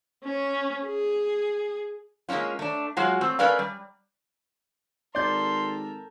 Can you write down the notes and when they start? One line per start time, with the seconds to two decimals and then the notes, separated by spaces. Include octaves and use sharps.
0.24 C#4
0.85 G#4
2.29 G#3 A#3 C4 C#4 F4
2.59 A3 D4
2.97 F#3 G#3 F4 F#4
3.21 A3 C4
3.39 A3 C#4 A#4 B4 D5 F5
3.59 G3
5.15 G#1 A4 A#4 D5 C6 G6